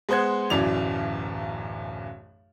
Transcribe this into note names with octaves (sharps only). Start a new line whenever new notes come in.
G#3 B3 C5 F#5 G#6
D1 B1 F#2 E3 D5 F7